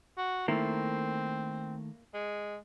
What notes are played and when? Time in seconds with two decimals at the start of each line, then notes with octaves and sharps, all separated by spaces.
0.17 F#4
0.48 D#3 A3 A#3 C4 E4
2.14 G#3